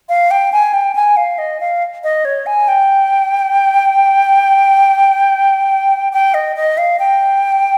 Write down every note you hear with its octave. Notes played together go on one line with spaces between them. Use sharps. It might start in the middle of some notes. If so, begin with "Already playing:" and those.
F5
G5
G#5
G5
G#5
F5
D#5
F5
D#5
C#5
G#5
G5
G5
D#5
D#5
F5
G5